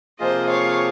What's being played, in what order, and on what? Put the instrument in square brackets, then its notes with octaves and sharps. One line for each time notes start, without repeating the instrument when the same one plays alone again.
[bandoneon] C3 F3 A#3 F4 G#4 [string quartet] C5 D#5
[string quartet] C#5 F5